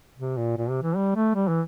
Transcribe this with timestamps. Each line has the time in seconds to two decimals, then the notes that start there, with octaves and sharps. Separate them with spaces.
0.18 C3
0.37 A#2
0.57 A#2
0.70 C3
0.83 E3
0.96 G3
1.16 A3
1.35 G3
1.48 E3